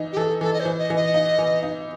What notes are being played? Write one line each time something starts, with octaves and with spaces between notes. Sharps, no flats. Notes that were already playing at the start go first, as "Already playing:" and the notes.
Already playing: E3 D#4
G4
E3 A4
E3 A4
D#5
C5
E3
D#5
E3
D#5
D#4
E3
D#4